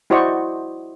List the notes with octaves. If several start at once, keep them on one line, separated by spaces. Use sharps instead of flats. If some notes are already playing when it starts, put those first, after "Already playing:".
E4 F#4 C5 D5 D#5 C#6